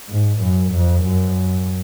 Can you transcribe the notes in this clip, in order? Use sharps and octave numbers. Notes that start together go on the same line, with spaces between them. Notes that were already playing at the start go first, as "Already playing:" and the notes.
G#2
F#2
F2
F#2